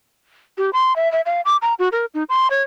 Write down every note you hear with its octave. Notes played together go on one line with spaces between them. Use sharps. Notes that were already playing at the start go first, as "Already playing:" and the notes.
G4
C6
E5
E5
F5
D6
A#5
F#4
A#4
D#4
C6
C#5